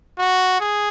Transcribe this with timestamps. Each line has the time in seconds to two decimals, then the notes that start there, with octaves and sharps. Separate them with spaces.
0.18 F#4
0.60 G#4